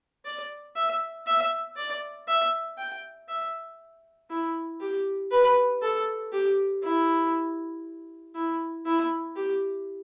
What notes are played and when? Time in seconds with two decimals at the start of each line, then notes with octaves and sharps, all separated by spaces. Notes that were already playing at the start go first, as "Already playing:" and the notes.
0.25 D5
0.76 E5
1.27 E5
1.77 D5
2.28 E5
2.78 G5
3.29 E5
4.30 E4
4.81 G4
5.31 B4
5.82 A4
6.32 G4
6.83 E4
8.35 E4
8.85 E4
9.36 G4